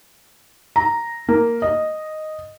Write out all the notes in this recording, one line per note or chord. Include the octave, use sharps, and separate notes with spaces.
A#5
A#3
D#5